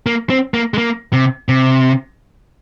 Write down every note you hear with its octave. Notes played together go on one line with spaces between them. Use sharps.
A#3
C4
A#3
G#3
A#3
C3
C3